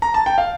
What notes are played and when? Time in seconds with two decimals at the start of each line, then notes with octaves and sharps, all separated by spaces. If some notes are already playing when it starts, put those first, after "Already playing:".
0.02 A#5
0.14 A5
0.26 G5
0.38 F5